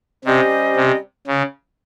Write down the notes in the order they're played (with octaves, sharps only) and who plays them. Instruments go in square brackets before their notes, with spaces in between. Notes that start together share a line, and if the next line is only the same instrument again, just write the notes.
[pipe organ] C3 [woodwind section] G3 C#4 G4 C5 D#5
[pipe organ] C3
C#3